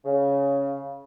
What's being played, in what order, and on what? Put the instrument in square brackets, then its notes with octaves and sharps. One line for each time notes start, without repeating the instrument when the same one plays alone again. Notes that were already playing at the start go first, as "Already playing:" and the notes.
[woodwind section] C#3